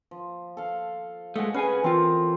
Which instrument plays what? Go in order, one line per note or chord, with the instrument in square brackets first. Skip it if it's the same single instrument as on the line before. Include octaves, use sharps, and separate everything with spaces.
[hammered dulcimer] F3
A4 F5
[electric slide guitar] G#3 A3 [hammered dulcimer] D#5 F#5
[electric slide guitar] C#4 G#4 G#5 [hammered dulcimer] B4 F#5
[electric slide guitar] E3 F4 [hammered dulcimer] C4 A4 A#4